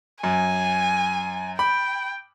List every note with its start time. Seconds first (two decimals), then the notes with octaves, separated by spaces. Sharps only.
0.23 F#2 G#5
1.59 G5 B5